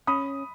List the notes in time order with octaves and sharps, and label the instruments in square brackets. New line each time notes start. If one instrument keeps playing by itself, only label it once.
[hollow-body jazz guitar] C#4 [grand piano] B5 D#6